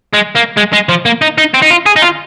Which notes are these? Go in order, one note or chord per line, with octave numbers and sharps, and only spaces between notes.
G#3
A#3
G#3
G#3
F3
A#3
D#4
D#4
C4
D#4
F4
G#4
D#4
F4